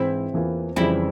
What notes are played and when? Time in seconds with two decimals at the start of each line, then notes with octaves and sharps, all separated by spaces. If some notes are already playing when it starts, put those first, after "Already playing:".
Already playing: G#2 E3 C4 E4
0.34 E2 E3 A#3 F4
0.76 F2 C#3 E3 G3 C4 E4